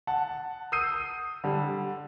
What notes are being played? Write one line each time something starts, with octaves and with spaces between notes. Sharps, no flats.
F#5 A5
D#6 E6 G6 C7 D#7
D3 G3